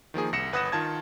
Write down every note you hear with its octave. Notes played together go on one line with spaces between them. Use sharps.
D#3 F3 A#3 G#4
C2 A#6 C#7 E7
G1 B4 F#5 D#6 A#6 E7
D#3 F4 A5 G#6